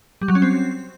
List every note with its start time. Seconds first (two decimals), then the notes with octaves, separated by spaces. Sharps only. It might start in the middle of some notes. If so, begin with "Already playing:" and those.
0.21 G3
0.28 F#3
0.35 C#4
0.42 C4